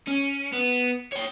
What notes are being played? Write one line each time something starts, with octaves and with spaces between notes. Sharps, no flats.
C#4
B3
C#5 G5